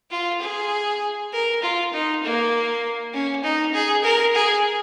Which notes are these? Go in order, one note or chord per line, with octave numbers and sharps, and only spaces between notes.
F4
G#4
A#4
F4
D#4
A#3
C#4
D#4
G#4
A#4
G#4